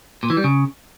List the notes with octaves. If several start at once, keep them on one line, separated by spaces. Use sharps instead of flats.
A#2
E3
G3
C#3